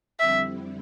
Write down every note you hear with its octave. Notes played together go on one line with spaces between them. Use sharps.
F2 D3 G3 C4 E4 E5